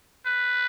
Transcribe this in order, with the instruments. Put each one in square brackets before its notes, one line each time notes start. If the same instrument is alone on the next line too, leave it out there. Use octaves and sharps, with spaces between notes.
[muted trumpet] B4